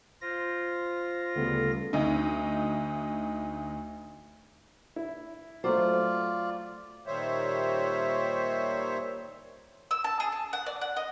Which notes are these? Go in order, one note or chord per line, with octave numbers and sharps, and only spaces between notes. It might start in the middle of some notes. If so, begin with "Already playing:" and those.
F4 C5 A#6
D2 C#3 G3 B3 A4
D2 D#4
E4
F#3 A3 F4 C5 D5
A#2 D#3 G3 C5 C#5 E5
E6
A5
G#4
A5
F#5
D5
F#5
D#5